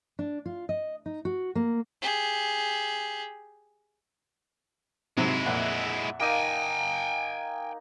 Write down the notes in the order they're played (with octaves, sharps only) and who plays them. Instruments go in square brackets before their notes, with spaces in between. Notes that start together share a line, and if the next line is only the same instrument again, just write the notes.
[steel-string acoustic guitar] D4
F4
D#5
D#4
F#4
A#3
[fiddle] G4 G#4
[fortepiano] G#2 C3 F#3 [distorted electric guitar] G#3 E4
[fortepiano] F2 A#2 [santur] E5 F#5
[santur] A#3 D#4 [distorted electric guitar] G5 G#5